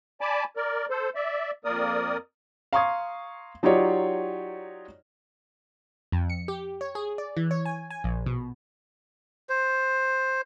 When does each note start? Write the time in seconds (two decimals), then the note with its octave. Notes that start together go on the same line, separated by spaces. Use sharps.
0.21 D5 G#5 A5 B5 D6
0.57 A#4 D5
0.90 A4 C5
1.15 D5 E5
1.65 F2 A#3 A#4 D5 D#6
2.73 F5 A#5 C6 C#6 D#6 G#6
3.63 F#3 D#4 F4 G4 C#5 D5
6.12 F2
6.30 C#7
6.48 G4
6.81 C#5
6.95 G#4
7.18 D5
7.37 E3
7.51 C#5
7.66 G#5
7.90 G#5
8.04 A#1
8.26 B2
9.49 C5